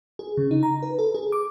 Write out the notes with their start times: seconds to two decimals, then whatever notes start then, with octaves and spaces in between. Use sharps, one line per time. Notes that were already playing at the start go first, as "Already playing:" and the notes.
0.19 G#4
0.37 C#3
0.51 D#4
0.63 A#5
0.83 B4
0.99 A4
1.14 G#4
1.32 D6